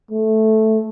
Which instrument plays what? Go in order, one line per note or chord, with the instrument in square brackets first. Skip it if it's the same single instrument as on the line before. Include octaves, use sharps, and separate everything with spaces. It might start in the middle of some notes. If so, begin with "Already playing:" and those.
[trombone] A3